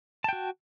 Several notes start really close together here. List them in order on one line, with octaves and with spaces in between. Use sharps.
A5 G5 F#4